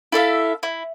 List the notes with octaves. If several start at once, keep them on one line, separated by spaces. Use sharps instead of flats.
E4 A4 E5 F5
E4